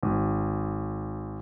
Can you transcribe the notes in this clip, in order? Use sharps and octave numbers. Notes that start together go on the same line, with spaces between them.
G#1